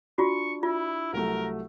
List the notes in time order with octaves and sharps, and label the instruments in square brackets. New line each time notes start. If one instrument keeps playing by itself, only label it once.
[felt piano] D4 [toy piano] F4 F#4 [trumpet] C#6
[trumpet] E4 [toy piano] F4
[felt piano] C2 F#3 A3 [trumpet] A#4